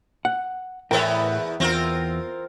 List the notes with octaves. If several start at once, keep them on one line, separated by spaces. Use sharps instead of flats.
F#5
E2 A2 B3 A#4 E5 G5
E2 C4 F4 A#4